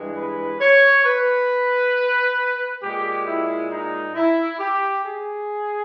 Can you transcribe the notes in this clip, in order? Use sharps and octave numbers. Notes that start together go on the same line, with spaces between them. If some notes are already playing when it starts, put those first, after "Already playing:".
Already playing: G2 E3 G#3
B4
C#5
B4
A#2 G#3 G4
E4
D#4
E4
G4
G#4